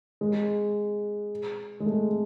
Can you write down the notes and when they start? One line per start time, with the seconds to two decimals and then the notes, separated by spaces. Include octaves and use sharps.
0.21 G#3
1.80 G#3
1.86 A3